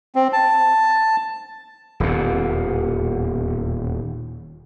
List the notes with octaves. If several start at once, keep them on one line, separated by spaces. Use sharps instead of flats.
C4
A5
D#1 E2 B2